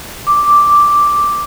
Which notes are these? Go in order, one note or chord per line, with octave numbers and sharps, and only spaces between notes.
D6